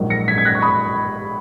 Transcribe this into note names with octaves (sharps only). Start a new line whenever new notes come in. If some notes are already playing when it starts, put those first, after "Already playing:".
Already playing: A#1 G#2 F#3 A#3
A#6 C#7
G#6 B6
G#6
F#6 A#6
C#6
B5 D#6